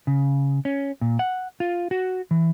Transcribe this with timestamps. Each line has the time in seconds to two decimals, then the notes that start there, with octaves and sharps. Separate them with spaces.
0.07 C#3
0.65 C#4
1.01 A#2
1.19 F#5
1.60 F4
1.91 F#4
2.31 E3